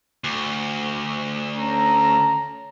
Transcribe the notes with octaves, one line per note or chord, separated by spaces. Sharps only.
D2
C#4 A4 A#5